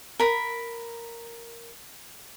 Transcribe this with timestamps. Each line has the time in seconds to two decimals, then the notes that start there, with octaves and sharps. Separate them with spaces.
0.20 A#4 B5